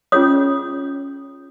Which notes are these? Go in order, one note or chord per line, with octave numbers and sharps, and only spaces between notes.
C#4 F4 G#4 C#5 D#6